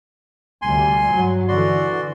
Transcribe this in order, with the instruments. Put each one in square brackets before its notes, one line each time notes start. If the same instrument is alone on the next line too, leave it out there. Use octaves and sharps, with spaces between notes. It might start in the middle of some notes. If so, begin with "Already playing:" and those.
[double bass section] D2 C3 G3 [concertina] G#5 C6
[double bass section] G2 F#3
[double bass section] D3 E3 [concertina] F#4 D5 C6